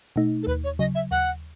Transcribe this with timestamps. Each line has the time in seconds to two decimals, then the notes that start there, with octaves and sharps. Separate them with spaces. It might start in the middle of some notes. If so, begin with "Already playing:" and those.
0.16 B2 A3 D#4
0.43 A4
0.47 D#2 B4
0.64 C#5
0.79 C#3 F#3 D#5
0.95 E5
1.11 D#2 F#5